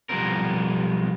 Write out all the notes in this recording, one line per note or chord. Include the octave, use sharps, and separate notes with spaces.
B1 F3 G3 B3 C4 A#4